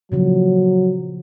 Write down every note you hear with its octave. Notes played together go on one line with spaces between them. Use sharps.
A#2 C#3 F3 F#3